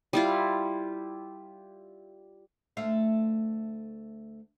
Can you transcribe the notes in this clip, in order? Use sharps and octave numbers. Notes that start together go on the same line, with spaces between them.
G3 E4 F4
D2 A3 F5